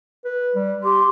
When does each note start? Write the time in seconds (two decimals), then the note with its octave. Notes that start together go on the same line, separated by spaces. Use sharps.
0.25 B4
0.55 G3
0.83 G4 C6